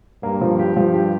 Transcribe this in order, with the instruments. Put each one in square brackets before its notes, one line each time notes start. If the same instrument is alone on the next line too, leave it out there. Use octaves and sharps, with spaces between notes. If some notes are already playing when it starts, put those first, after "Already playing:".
[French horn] G2 [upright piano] A#3
[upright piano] F3
G4
[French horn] G2 [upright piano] F3
[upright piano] G4